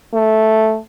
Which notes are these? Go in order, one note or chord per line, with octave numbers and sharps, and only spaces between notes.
A3